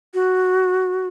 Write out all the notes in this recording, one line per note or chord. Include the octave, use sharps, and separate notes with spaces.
F#4